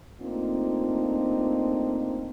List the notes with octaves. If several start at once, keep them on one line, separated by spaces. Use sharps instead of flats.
A3 A#3 C4 D4 D#4 F4